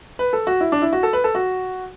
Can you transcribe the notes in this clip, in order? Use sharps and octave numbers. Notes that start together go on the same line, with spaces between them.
B4
A4
F#4
E4
D4
E4
F#4
A4
B4
A4
F#4